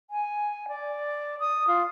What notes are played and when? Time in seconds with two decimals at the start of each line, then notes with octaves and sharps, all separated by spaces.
0.10 G#5
0.68 D5
1.40 D#6
1.67 F4